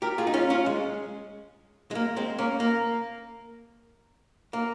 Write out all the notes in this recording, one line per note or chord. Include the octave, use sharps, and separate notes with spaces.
G4 A#4
F4 G#4
D#4
C#4 F4
C#4 F4
G#3
G#3
A#3
G#3 C4
A#3 C#4
A#3
A#3